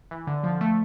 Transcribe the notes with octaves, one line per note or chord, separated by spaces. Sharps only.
E3
D3
F3
A3